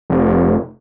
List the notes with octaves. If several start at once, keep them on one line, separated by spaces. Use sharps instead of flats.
F1